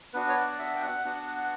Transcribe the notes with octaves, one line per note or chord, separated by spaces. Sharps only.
B3 D4 F#4 B4
C#5
D5
E5
G5
F#5
B3 D4 F#4